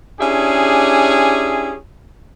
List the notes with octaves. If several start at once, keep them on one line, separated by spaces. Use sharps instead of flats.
C#4 D4 E4 G4 G#4